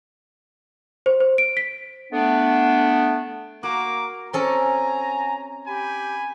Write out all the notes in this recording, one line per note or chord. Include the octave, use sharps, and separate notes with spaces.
C5
C5
D7
B6
A3 B3 D4
A#3 F#4 A#4 D6
C4 C#4 A4 G#5 A#5
G4 G#5 B5